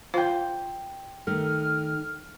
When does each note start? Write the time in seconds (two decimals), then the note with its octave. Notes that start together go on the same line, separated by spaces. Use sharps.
0.14 F4 C5 F5 G5 C6
1.27 D#3 A3 F6